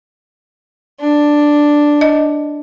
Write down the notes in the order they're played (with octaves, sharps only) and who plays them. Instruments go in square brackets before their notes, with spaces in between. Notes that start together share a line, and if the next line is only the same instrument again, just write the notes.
[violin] D4
[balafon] D#5